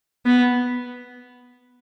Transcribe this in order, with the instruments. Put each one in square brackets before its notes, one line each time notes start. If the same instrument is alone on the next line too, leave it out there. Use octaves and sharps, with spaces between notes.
[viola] B3